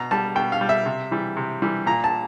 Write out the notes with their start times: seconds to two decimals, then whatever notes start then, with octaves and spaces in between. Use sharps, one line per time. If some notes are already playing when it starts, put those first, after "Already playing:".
Already playing: B2 A#5
0.11 G3 A5
0.35 B2 G5
0.52 F5
0.61 G3
0.69 E5
0.86 C3
1.11 E3 G3
1.37 C3
1.62 E3 G3
1.86 A#2 A#5
2.04 A5